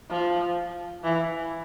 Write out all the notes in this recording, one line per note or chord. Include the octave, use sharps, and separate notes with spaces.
F3
E3